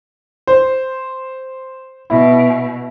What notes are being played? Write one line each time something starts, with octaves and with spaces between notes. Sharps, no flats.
C5
B2 E4